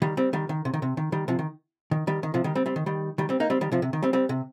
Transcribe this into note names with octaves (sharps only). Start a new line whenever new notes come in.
D#3 G3
G3 C4
D#3 G3
D#3
C3
D#3
C3
D#3
D#3 G3
C3 F3
D#3
D#3
D#3 G3
D#3
C3 F3
D#3 G3
G3 C4
G3 C4
D#3
D#3 G3
D#3 G3
G3 C4
A#3 D#4
G3 C4
D#3 G3
C3 F3
C3
D#3
G3 C4
G3 C4
C3